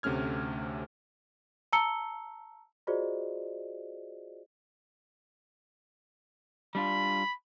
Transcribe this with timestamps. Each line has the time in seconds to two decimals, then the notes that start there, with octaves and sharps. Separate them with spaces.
0.03 D2 C3 A3 C#4 F6 G#6
1.73 A5 A#5 E6 C#7 G7
2.87 F4 F#4 G#4 C5 D5 D#5
6.75 G3 D4 F4 B5